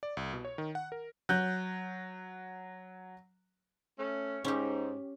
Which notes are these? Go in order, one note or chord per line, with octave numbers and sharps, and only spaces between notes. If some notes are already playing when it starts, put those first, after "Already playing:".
D5
C2
B2
C#5
D#3
F#5
A#4
F#3 F#6 G6
A3 C#4
G#2 C#4 G4